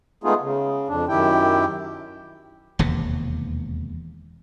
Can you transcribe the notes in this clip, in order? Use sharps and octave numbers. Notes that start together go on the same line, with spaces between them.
G#3 A3 B3 D#4 F4 G#4
C#3
F2 D4
F#2 D#3 E4 G4 G5
E1 D#2 C3